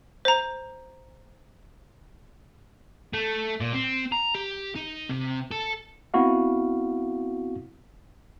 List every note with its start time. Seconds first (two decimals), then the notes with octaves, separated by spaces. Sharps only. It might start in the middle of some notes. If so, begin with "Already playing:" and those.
0.25 C5 A#5
3.13 A3
3.60 A#2
3.73 C4
4.12 A#5
4.35 G4
4.76 D#4
5.10 C3
5.51 A4
6.14 B3 C4 E4 F#4 F5